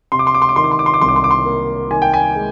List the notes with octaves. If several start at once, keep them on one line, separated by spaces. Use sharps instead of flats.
C3 C6
D6
C6
D6
C6
D6
D#3 C6
D6
C6
D6
C6
D6
C2 C6
D6
C6
D6
C6
A#3
D#3 G#5
G5
G#5
G#3